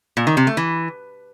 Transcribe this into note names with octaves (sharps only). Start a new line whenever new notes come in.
A#2
D#3
C3
A3
E3